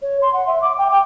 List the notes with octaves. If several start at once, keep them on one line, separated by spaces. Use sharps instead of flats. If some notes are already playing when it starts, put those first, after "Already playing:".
C#5
C6
F#5
E5
D6
G5
G5